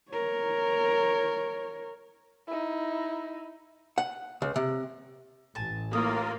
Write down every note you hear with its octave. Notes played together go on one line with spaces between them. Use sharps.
A#4 C#5
D#4 E4
F#5
C#2
C3
A1 G#5 A5
A2 A#3 F4 A#4 D#6